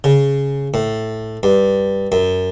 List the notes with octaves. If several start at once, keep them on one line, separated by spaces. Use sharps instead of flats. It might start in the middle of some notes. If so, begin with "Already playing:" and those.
C#3
A2
G2
F#2